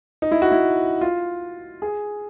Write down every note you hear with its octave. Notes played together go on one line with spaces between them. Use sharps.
D#4
E4
F#4
E4
F4
G#4